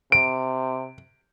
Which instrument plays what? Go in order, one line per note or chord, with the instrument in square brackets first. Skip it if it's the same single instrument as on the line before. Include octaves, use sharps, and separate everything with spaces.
[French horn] C3 [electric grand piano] D7